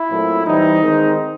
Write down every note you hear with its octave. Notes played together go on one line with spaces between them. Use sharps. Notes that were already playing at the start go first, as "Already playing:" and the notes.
Already playing: E4
A#2 F#3 A3 C4
E3 G3 C4 D#4
D#3 G#3 C4